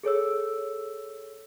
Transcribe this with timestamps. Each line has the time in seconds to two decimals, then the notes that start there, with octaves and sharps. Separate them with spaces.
0.03 G#4 A4 C#5 E6